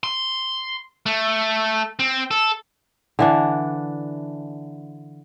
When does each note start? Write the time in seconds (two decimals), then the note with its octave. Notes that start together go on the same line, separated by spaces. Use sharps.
0.04 C6
1.06 A3
1.99 C4
2.31 A4
3.19 D3 E3 D4